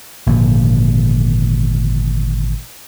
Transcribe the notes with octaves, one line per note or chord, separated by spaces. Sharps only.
G#1 A#2 D3 F3